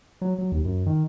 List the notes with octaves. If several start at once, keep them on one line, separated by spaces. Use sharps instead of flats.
F#3
F#3
D#2
F#2
D#3